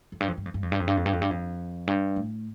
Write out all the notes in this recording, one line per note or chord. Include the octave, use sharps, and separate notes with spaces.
F2
G2
F2
G2
F2
G2
F2
G2
F2
G2
F2
G2
F2
G2
F2
G2
A2